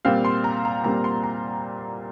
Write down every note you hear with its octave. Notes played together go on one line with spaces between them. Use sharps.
A#2 G3 C4 F5
C6
A#5
A#5
A#2 G3 C4 A#5
C6
A#5